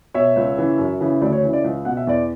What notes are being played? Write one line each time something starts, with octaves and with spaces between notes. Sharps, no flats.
B2 C#5 E5
C#2
C#3 E3
F#2
C#3 E3
D2 D5
C#5
C#3 E3
D5
C#2
B2 F#5
E5
E2 D5